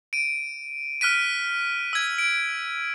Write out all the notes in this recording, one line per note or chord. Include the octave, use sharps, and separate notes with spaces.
D7 D#7
F6 F#6 B6 D#7
E6 G#6
D7